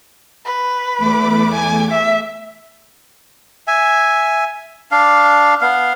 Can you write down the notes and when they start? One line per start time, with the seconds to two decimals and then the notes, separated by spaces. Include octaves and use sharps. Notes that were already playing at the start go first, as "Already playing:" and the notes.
0.45 B4
0.98 E2 A3 D6
1.54 G#5
1.91 E5
3.68 E5 G#5
4.91 D4 F5
5.61 B3 F5